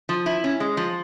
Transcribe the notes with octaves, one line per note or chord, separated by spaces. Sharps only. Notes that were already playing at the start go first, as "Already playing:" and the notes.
F3
E4
C#4
G#3
F3